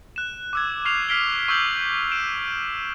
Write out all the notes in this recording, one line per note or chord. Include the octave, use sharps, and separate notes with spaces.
F#6 E7
D6 E6 G#6
C#6 F6 C7 F7
F6 B6 C7 D7 G7
C#6 E6 G6 F#7
D7 E7